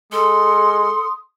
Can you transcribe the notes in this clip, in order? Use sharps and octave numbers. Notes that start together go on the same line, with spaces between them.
G#3 A4 C6 D#6